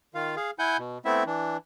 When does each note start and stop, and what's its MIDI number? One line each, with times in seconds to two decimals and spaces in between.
0.14 0.36 51
0.14 0.36 65
0.14 0.36 77
0.37 0.51 68
0.37 0.51 77
0.59 0.77 64
0.59 0.77 78
0.59 0.77 80
0.59 0.77 91
0.79 0.98 47
1.05 1.24 57
1.05 1.24 59
1.05 1.24 60
1.05 1.24 64
1.05 1.24 76
1.26 1.57 52
1.26 1.57 62